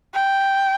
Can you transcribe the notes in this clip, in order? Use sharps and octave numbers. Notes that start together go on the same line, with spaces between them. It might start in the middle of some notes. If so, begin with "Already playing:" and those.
G5